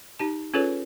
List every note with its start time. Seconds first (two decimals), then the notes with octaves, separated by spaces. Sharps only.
0.19 D#4 G4 A5
0.54 C#4 F4 G#4 A4 B4 C#5